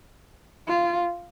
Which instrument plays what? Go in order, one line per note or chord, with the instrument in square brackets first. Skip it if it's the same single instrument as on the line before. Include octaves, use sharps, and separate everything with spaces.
[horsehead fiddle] F4